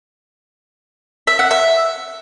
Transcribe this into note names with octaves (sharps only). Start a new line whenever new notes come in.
E5
F#5
E5